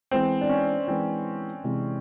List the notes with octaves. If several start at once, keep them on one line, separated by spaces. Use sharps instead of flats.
E3 G#3 B3 C4
D4
C#4
E3 G#3 B3 C4
C3 E3 G#3